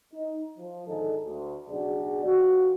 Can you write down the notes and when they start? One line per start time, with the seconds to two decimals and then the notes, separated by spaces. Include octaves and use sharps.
0.12 D#4
0.57 F3
0.87 G#1 D3 D#4 G#4 A4
1.24 D2
1.68 B1 C#3 D4 F#4 G#4 D5
2.24 F2 F#4